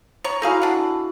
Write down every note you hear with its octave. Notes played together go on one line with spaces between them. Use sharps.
C#5 A#5
D#4 E4 F#4 G#4 A4 F5
D4 F#5